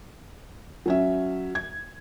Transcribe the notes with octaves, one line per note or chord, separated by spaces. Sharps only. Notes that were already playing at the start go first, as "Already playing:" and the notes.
F#3 C#4 E5
G#6